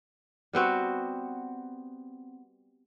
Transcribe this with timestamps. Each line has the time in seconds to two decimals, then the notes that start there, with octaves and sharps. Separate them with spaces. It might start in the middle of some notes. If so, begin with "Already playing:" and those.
0.53 G3 B3 C4 F#4